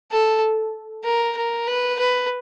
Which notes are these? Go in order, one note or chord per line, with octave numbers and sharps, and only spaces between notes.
A4
A#4
A#4
B4
B4